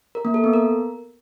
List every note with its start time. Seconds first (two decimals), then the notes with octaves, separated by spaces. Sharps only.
0.15 A#4
0.25 A#3
0.34 A4
0.44 B3
0.53 A#4